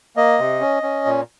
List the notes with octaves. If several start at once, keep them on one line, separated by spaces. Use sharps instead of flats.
A#3 D#5
C3
C#4
C#4
A#2